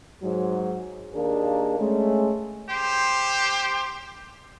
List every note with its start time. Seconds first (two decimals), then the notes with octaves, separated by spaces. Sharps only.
0.23 G#2 F#3
1.14 D#2 A#3 D4 G#4 A#4
1.78 G#3 A3 C#4
2.69 G4 C5